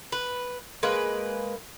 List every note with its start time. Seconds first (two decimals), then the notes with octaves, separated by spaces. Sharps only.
0.12 B4
0.83 G#3 A#3 B4